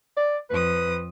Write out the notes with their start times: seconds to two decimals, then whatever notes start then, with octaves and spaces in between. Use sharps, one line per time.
0.17 D5
0.50 F2 B4 D#6